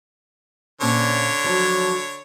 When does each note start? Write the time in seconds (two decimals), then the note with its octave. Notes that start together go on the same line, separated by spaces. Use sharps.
0.81 A#2 D3 C4 C#4 C#5
1.44 F3 F#3